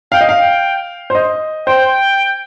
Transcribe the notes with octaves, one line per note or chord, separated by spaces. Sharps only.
F5 G5
D#5
F5
G5
C5
D#5
C5 G5